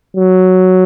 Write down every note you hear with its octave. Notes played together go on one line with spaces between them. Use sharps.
F#3